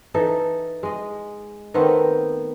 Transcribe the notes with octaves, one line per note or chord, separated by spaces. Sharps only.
E3 D#4 A4
G#3 D#5
D#3 A3 B3 C4